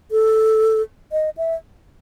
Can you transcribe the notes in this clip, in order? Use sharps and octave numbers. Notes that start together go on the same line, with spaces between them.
A4
D#5
E5